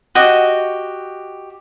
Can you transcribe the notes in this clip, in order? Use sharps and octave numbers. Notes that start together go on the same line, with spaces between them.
F#4 G4 D#5